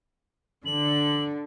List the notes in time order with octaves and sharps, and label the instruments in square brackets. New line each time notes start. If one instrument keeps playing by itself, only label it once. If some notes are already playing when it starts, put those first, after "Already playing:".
[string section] D3 [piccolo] F#7